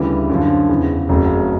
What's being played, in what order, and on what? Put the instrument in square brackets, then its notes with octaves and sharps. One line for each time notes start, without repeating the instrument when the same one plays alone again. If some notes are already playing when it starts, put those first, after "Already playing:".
Already playing: [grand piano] D2 C#3 E3 G3
F#2 D3 F3
E2 C#3 E3
F#1 F2 C#3 F#3 A3